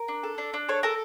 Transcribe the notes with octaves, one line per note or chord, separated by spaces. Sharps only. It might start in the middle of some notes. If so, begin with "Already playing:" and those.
Already playing: A#4
D4
A4
D4
D4
A4 C#5
A4 A#4